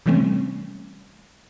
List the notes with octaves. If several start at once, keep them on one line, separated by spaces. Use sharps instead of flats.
C3 E3 G3 A3 C4 C#4